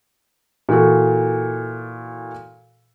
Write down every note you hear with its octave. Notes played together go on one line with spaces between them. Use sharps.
A#2 E3 F#4 A4